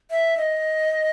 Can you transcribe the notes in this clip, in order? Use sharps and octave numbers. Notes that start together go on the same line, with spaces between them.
E5
D#5